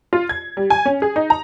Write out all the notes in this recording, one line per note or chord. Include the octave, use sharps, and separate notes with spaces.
F4
G#6
G3
G#5
C#4
G#4
D#4
A#5